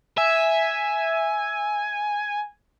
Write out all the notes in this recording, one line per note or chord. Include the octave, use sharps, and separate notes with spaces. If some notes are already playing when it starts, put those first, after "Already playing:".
E5 G#5